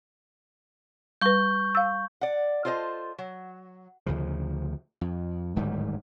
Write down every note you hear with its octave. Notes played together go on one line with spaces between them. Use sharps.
G3 B4 C#6 G6
F5 E6
D5 F#5
F4 A4 C5 D5 D#5
F#3
D2 C#3 F3
F2
D1 G#2 D#3 G3